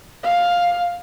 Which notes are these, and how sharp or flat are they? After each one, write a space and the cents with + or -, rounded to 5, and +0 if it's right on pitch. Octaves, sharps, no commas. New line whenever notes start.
F5 +5